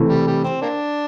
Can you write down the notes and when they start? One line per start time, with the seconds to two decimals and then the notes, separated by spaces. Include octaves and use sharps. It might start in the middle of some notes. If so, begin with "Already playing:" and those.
Already playing: C3 E3 A3
0.09 G3
0.27 G3
0.44 C4
0.62 A#3 D4